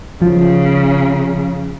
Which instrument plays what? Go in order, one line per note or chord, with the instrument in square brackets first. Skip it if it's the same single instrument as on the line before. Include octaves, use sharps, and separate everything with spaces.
[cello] C#3 [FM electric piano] F3